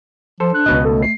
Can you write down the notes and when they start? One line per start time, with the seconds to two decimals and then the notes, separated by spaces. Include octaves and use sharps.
0.40 F3 A4 C5
0.54 D4 F#6
0.66 C#2 B2 D#5
0.85 A3 A4
1.03 C7